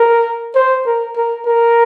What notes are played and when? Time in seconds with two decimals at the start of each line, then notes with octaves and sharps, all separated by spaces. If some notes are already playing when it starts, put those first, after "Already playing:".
Already playing: A#4
0.55 C5
0.86 A#4
1.16 A#4
1.46 A#4